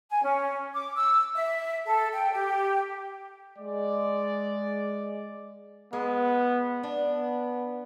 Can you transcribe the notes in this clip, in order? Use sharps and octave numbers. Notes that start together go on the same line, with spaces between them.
G#5
C#4
D6
E6
E5
A4
G5
G4
G#3 D5
G#3 B3
B3 D4